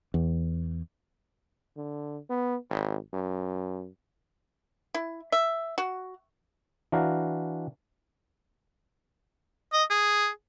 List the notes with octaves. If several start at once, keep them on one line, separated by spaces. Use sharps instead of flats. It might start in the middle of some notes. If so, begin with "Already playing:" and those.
E2
D3
B3
G#1
F#2
E4
E5
F#4
E3 D4 F#4 F5 A#5
D#5
G#4